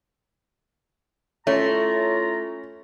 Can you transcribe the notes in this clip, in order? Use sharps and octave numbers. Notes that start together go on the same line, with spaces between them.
A3 C#4 E4 F4 A#5